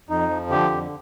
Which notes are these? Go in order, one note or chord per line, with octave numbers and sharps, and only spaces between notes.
F2 D#4
F3
D3 G4
F2